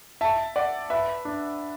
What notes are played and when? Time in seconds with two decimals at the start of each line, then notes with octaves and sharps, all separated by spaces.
0.21 E5 A5
0.56 D5 F#5
0.90 B4 E5
1.25 D4